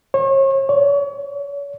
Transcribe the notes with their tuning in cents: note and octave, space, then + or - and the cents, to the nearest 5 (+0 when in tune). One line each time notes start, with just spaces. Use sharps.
C#5 -35
C#5 +40